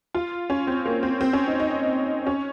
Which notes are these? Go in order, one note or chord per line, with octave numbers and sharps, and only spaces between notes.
F4
C#4
C4
A#3
C4
C4
C#4
D#4
D#4
C#4